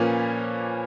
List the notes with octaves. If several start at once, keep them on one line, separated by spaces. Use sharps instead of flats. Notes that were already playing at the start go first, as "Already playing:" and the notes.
Already playing: A#2 F3 A#3 C#4 B4